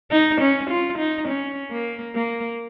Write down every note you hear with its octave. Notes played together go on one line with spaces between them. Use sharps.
D#4
C#4
F4
D#4
C#4
A#3
A#3